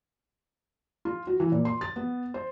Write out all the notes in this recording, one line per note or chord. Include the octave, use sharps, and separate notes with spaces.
F4
F#4
E3
A#2
C6
A6
B3
C5